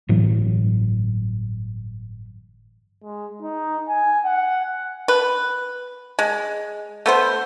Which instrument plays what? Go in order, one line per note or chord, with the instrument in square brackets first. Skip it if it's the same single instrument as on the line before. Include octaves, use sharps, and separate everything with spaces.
[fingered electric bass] G1 A2 E3 F#3
[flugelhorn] G#3
D#4
G#5
F#5
[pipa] B4
G#3
A3 B3 C5